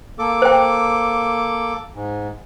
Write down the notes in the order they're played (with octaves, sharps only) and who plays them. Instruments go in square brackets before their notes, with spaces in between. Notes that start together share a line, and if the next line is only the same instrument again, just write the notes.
[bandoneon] A#3 A4 D6
[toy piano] C5 G5
[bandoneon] G#2